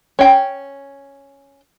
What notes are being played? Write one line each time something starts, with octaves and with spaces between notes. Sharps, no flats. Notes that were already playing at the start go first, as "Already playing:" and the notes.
C#4 G5